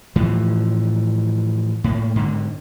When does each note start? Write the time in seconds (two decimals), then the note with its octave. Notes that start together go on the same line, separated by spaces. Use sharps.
0.16 A2 E3 F3
1.84 A2 A#3
2.16 G#2 D3